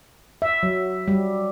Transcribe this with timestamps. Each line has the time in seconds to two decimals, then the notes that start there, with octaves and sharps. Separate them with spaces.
0.42 E5
0.63 F#3
1.08 G3